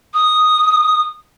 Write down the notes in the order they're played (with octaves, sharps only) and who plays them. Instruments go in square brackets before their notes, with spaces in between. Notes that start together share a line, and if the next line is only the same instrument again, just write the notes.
[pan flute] D#6